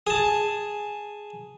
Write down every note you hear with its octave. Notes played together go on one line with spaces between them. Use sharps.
G#4 A5